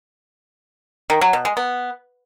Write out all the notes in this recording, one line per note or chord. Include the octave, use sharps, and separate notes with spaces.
D#3
F#3
B2
G#3
B3